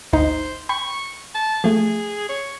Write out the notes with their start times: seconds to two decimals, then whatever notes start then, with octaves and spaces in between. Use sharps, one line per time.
0.13 G#1 D2 D#4 C5
0.69 G5 B5 C#6
1.35 A5
1.64 F3 A3 G#4
2.29 C#5